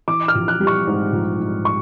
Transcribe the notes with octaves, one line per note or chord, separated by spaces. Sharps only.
E3 D6
F6
A#1
F#6
G3
C#6
G#2
A#1
G#2
C#6